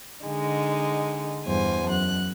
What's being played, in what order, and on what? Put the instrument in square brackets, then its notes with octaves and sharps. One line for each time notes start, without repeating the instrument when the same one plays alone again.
[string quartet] D3 G#3 D#4
E2 G2 C5 G#5
F#2 F#6